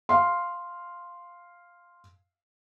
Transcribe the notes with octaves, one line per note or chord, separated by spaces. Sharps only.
F5 C6